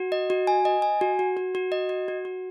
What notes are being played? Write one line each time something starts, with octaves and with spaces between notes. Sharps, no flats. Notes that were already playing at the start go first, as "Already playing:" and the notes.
Already playing: F#4
D#5
F#4
G#5
D#5
G#5
F#4
F#4
F#4
F#4
D#5
F#4
F#4
F#4